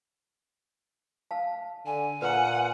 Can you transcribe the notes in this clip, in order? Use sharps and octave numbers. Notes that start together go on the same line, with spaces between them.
F5 A5
D3 G#5
A#2 B4 F#5 A#5